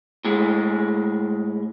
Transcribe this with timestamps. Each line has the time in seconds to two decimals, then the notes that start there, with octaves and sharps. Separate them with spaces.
0.25 A2 G#3